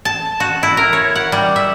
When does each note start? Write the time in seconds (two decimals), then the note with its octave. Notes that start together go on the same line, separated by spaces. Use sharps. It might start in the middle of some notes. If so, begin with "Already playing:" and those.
0.05 A5
0.40 F#4
0.63 E4
0.77 A#4
0.93 C#5
1.15 F#5
1.32 G3
1.56 E5